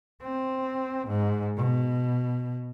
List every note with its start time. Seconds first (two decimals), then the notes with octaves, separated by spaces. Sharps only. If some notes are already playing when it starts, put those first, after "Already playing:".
0.22 C4
1.08 G#2
1.57 B2